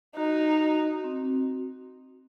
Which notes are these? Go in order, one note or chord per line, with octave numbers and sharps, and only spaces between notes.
D#4 F#4
F#4
C4